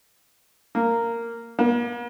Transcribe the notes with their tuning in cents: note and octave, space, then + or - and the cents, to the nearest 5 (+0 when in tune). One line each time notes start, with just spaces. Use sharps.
A#3 -10
A#3 +45